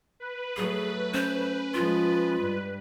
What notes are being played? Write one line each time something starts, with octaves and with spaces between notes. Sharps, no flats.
B4
F#3 A3 G#4
C#4 C5
F3 G#3 F4
G2